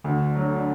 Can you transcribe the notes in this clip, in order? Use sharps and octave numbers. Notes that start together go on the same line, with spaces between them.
D2 D3
F#3